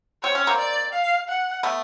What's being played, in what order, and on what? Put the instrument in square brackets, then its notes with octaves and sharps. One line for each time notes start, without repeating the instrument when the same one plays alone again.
[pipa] C4 [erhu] C#5
[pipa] C#4
A#3 C4
[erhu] D5
F5
F#5
[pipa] A3 B3